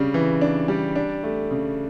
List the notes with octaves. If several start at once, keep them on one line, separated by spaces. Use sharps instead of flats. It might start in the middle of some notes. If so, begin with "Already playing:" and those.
Already playing: C#3 G3 D4
E3
D4
G3
D4
A3
C#3